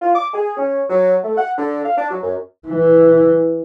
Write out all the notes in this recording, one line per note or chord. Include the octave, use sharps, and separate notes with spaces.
F4
D6
G#4
C#4
F#3
A3
F#5
D3
F5
D4
F#3
F#2
E3